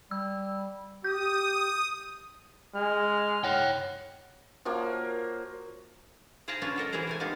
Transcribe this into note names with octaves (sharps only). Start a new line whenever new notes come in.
G3 E6
G4 D#6 G6
G#3 F6
C#5 F#5 G5
F3 F#3 A#3
G#4 C5 F5 G5 A5 A#5
C#4 D4 F4 B4 C#5
F#3 A4 A#4 D#5
E3 E4 G#4 A#4 C5
C3 A3 G#5
G3 G#3 B3 D#4 F4